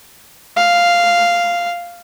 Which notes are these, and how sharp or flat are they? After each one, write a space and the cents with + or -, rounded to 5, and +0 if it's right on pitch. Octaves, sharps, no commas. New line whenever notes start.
F5 -5